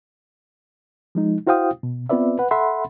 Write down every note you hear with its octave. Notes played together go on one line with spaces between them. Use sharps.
F3 G#3 D#4
E4 F#4 C5 F5 G5 D#6
B2
B3 C4 F4 B4 D5 E5
B4 F#5
A4 E5 F#5 B5 C6